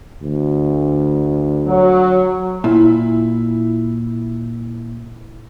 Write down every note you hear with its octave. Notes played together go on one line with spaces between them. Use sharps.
D2
F#3
A#2 E4